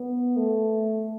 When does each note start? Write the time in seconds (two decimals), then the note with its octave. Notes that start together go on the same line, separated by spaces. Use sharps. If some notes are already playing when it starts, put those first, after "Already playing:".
Already playing: B3
0.36 A3